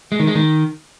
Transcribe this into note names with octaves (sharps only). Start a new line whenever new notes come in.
G#3
D#3
G#3
D#3